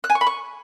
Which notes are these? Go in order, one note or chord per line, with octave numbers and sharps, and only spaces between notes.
F#6
G#5
C#6
B5
C#6